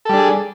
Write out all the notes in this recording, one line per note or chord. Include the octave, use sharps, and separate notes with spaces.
G3 D4 G#4 A4